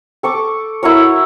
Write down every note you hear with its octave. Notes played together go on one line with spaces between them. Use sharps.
A4 C#6 D6
E4 F#4 A#4 C#5